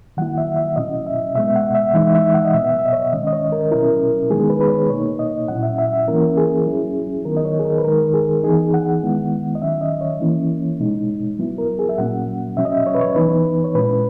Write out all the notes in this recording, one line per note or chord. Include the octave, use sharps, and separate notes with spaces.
D#3 F#3 A#3 E4 F#5
E5
E5
B2 F#3 C#4 E4 D#5
E5
B2 G#3 B3 E5
F#5
E5
E3 G#3 D#4 E5
E5
F#5
D#5
B2 F#3 B3 E5
F#5
E5
D#5
C#5
D#3 G#3 C#4 D#5
D#5
C#5
A#4
B2 F#3 C#4 E4 A#4
D#3 G#3 B3 D#4 G#4
B4
B4
C#5
B2 A#3 D#4 C#5
D#5
A#2 F#3 C#4 E4 F#5
E5
E5
E5
E3 A#3 C#4 E4 A#4
G#4
F#3 C#4 E4
D#3 F#3 B3 D#4 A#4
D#5
C#5
G#4
A#4
B4
D#3 G#3 D#4 A#4
G#4
E3 B3 D#4 G#4
F#5
D#3 G#3 B3 E4
D#5
D#3 F#3 C#4 E5
D#5
C#5
E3 A#3 C#4 E4
B2 G#3 D#4
F#3 B3 E4
A#4
G#4
E5
A#2 F#3 A#3 C#4 F#5
B2 F#3 C#4 E5
D#5
E5
C#5
B4
C#5
E3 B3 D#4 B4
C#5
A#2 G#3 C#4 E4 B4